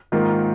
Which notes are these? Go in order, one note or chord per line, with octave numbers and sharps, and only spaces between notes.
G#2 D#3 A#3 F4